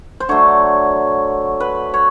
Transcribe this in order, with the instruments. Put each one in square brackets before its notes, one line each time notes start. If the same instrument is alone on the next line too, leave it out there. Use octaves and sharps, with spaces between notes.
[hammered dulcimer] C5
D3 F#3 A3 C#5
B4
C#5